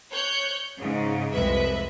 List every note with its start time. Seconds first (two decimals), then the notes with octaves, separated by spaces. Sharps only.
0.12 C#5 F#6 G6
0.78 G#2 C#3
1.33 C2 F2 G#3 B4 E5